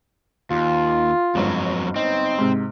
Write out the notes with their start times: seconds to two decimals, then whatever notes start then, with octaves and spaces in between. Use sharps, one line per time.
0.51 D#2 F4
1.35 G1 F2 G#2 F#3
1.96 C4 D#4
2.38 G#2 C3